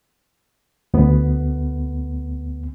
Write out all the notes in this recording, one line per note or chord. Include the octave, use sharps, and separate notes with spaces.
D2 B3